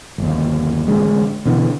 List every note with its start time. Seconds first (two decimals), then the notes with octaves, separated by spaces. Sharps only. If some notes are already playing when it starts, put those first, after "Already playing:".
0.18 G1 D#2
0.88 A1 D3 G#3
1.45 B2 D3 E3